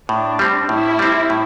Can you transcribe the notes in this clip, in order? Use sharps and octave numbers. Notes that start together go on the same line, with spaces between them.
A2 D4
G3 C4
A2 E4
G3 C4
A2